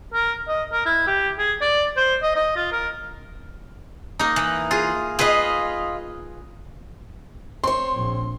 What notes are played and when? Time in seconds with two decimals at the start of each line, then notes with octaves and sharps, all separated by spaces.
0.14 A#4
0.48 D#5
0.72 A#4
0.86 E4
1.07 G4
1.38 G#4
1.61 D5
1.97 C5
2.23 D#5
2.36 D#5
2.56 F4
2.72 A#4
4.19 A#3 D#4
4.36 E3
4.71 F4 G#4
5.19 F4 G#4 B4 D#5
7.64 C4 C#5 C6
7.95 A#1